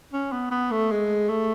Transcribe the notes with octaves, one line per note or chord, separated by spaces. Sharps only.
C#4
B3
B3
A3
G#3
A3